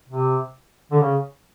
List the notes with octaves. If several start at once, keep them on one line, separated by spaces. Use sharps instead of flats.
C3
D3
C#3